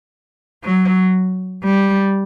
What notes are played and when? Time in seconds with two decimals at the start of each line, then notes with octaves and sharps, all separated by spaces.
0.63 F#3
1.65 G3